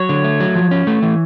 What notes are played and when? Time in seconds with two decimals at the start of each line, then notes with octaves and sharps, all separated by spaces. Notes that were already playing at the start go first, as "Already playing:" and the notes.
Already playing: F#3 C#5
0.09 D3
0.24 A3
0.40 F#3
0.56 F3
0.71 C#4
0.87 A3
1.02 E3